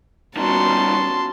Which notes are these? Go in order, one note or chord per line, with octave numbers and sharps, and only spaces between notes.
D#3 G3 B3 C#4 F#4 A5 C6